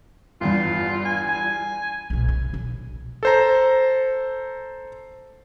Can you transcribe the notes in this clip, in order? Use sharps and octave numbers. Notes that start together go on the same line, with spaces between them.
G1 E2 G2 F4
G#5
G#5
B1 A#2
C3
B1
A4 C5 A#5